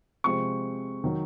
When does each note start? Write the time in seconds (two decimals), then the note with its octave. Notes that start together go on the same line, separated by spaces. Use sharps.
0.24 C3 F3 G#3 C4 C#6
1.04 D#3 F#3